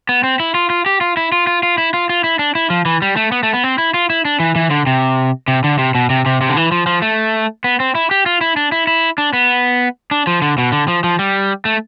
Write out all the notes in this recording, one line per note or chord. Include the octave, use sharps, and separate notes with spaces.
B3
C4
E4
F4
F4
G4
F4
E4
F4
F4
F4
E4
F4
F4
E4
D4
E4
F3
E3
G3
A3
B3
A3
B3
C4
E4
F4
E4
D4
E3
E3
D3
C3
C3
D3
C3
B2
C3
C3
C3
D3
E3
F3
F3
A3
B3
C4
E4
G4
F4
E4
D4
E4
E4
D4
B3
D4
F3
D3
B2
D3
F3
F3
G3
A3